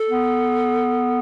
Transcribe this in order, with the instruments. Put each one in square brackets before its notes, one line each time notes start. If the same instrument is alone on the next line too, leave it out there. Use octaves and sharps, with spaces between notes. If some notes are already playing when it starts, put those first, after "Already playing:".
Already playing: [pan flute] A4
[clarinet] B3